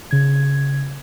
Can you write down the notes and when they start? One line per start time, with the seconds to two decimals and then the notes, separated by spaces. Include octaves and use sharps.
0.11 C#3 G#6